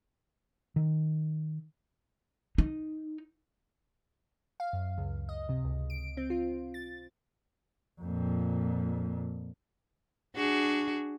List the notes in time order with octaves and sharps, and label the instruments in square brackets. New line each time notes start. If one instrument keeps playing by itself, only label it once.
[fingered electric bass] D#3
[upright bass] D#4
[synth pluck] F5
F#2
C#2
D#5
C3
C#2
D7
C4
F4
A6
[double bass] F2 A#2
[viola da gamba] D4 F#4 G#4